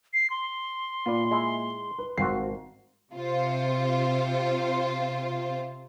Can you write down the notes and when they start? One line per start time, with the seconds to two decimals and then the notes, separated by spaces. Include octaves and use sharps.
0.14 C7
0.30 C6
1.06 A#2 F4 B4 D5
1.31 G#3 E4
1.99 B4
2.18 G#1 C4 F4 F#4 C7
3.14 C3 F4 C5